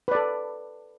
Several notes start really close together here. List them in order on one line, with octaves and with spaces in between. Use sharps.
B4 D5 A4